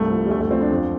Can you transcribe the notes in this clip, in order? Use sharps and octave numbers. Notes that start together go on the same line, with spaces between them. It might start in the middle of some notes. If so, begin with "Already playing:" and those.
Already playing: C2 G2 A3
F3
G3
D2 A3
A3
F3 C4
D4
F2